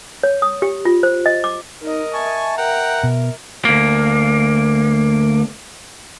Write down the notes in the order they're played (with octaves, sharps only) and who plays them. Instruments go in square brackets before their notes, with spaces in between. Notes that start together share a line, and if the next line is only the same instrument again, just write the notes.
[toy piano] C#5
D#6
G4
F4
C5
D#5
D6
[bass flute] D#4 [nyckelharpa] A#4 D#5
[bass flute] E5 [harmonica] G#5 A5 C#6
[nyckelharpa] A#4 [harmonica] F#5 G5 A#5
[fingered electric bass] B2
[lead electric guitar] D2 A#3